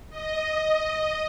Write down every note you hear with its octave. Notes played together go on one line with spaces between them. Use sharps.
D#5